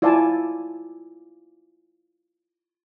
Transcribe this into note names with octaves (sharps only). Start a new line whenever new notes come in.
E4 F4 D5 F5 G#5 A5